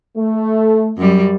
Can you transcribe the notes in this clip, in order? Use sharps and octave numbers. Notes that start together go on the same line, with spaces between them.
A3
F#2 G3